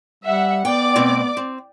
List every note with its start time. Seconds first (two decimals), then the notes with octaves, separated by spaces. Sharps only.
0.24 G3 E5 F#5
0.65 B3 D5 G5 D6
0.96 B2 A3 C4
1.37 C4